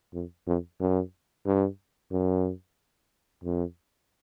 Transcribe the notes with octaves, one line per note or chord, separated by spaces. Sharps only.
F2
F2
F#2
G2
F#2
F2